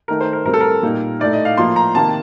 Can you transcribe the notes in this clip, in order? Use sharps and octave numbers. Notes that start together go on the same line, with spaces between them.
D#3 A3 D#4 A#4
C5
A#4
A2 G3 C4 A#4
A4
A#4
A#2 G3 A#3 D#4
A2 A3 D#4 D5
D#5
F5
A2 F3 A#3 C6
A#5
C3 D#3 A#3 A5